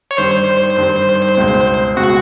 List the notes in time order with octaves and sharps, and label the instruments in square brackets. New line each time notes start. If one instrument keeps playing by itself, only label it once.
[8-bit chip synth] C#5
[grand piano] G2 D#3 G3 [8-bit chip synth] C5
[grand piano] G2 D#3 G3
C#2 B2 G#3
[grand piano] C#2 B2 G#3 [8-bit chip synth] F#4